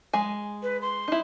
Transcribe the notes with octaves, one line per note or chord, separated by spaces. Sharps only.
G#3 G#5
B4
C6
D#4 E4